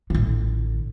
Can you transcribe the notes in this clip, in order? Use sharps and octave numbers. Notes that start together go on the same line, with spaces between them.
A1 D3